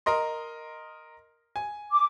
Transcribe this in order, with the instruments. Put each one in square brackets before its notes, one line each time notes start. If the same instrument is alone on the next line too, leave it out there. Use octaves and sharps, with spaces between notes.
[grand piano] A#4 D#5 C6
G#5
[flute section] D6